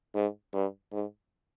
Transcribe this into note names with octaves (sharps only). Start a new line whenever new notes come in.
G#2
G2
G#2